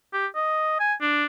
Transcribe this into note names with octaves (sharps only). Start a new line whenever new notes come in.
G4
D#5
G#5
D4